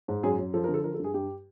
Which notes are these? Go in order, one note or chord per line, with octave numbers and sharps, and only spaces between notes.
G#2
F#2 G#4
F#2
F3 A4
A#4
D3
A4
F3 A#4
A4
G2 G#4
G2 G4